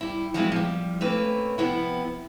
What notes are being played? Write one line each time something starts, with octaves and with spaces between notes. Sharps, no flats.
G3 E4
F3 F#3 G#3 B3 C4 E4
F3 G3
A3 A#3 C4 C#4 B4
C3 F3 B3 E4